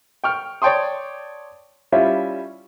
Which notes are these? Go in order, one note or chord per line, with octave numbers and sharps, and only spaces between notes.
G5 C#6 F6
C#5 D5 G5 A5 C6 D#6
G3 C#4 E4 F4 E5